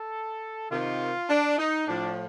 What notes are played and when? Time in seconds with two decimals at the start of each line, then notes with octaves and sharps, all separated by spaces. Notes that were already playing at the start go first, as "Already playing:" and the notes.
Already playing: A4
0.72 C3 D#3 F4
1.30 D4
1.58 D#4
1.87 A2 F3 D4